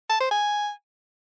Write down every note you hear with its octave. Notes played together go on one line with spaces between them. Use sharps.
A5
C5
G#5